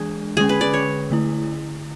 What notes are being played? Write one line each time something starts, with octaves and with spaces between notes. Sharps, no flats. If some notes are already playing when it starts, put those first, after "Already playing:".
Already playing: E3 G#3 D4 G#4
D3 G#3 C#4 G#4
B4
D5
C#5
D3 A3 E4